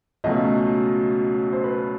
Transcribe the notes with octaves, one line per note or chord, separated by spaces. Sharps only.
C#2 B2 F#3 A3 C#4 D#5
C5
B4